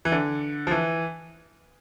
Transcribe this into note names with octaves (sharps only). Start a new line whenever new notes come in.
E3
D3
F3
E3